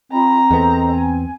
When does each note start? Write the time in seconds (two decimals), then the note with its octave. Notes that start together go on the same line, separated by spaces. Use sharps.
0.12 C4 F4 D#5 A#5 B5
0.51 E2 B3 A4 C5 D#5
0.91 G#5